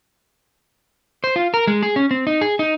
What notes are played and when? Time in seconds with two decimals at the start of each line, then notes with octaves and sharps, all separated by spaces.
1.24 C5
1.36 F4
1.54 A#4
1.67 G#3
1.83 G#4
1.96 C#4
2.11 C4
2.27 D#4
2.41 G#4
2.59 D#4